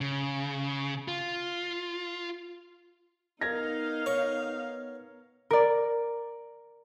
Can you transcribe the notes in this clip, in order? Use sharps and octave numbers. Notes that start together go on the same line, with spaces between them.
C#3
F4
B3 D#4 A#4 F5 G#6 A#6
C#5
A#4 D5